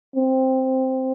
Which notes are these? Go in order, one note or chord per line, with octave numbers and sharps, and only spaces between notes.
C4